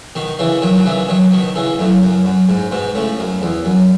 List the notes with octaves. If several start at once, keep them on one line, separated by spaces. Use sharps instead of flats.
B2 D#3
C#3 E3
D#3 F#3
F#3
C#3 E3
D#3 F#3
B2 D#3
C#3 E3
F#2 A2
F#2
F#2
G#2
G#2 B2
A2 C#3
F#2
E2
F#2